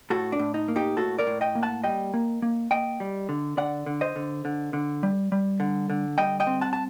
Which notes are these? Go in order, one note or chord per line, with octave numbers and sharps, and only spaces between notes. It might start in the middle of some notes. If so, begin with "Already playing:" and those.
A2 F#4 A4
D4
A2
D#4
A#3
D#4 G4
A2 F#4 A4
A#4 D5
A2
D#5 G5
A#3
F#5 A5
G3 D#5 G5
A#3
A#3
A#3 D#5 G5
G3
D3
D3 D5 F#5
D3
C5 D#5
D3
D3
D3
G3
G3
D3
D3
G3 D#5 G5
D#5 G5
C4
F#5 A5
A5